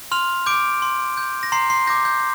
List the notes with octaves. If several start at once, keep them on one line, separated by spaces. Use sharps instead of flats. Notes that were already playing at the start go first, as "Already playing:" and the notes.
C6 F6 F7
D6 G6 D7
C6
G6
A#6
A#5 C6 C7
C6 C7
D6 G6 A#6
G6